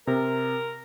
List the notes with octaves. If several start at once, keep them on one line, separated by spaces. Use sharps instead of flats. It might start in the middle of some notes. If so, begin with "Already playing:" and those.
C3 A#4